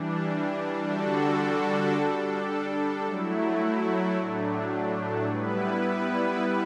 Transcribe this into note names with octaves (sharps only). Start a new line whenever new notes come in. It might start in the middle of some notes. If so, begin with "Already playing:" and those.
Already playing: E3 G3 D4
D3 G3 D4 F#4 A4
G3 D4 A4
F#3 A3 E4
A2 F#3 A3 D4
G3 B3 E4 B4